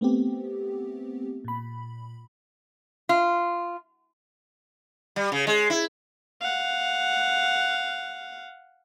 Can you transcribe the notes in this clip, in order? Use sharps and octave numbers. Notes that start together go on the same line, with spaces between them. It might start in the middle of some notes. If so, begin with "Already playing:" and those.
A3 B3 C4 G4
A#2 B5
F4
G3
C#3
G#3
E4
F5 F#5